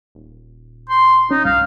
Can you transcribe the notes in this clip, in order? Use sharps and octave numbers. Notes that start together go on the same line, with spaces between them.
D#1
C6
C#4 D#4
C2 G2 F5